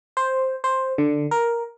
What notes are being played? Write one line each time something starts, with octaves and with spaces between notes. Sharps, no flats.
C5
C5
D3
A#4